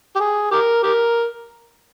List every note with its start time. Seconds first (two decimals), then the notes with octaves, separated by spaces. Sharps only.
0.16 G4
0.20 G#4
0.51 G4 A#4
0.83 G4 A#4